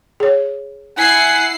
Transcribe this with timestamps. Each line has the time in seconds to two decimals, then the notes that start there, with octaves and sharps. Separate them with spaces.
0.20 G#4 C#5
0.97 E4 F#5 G#5 C7